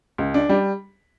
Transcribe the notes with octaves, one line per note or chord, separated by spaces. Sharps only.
C#2
D4
G3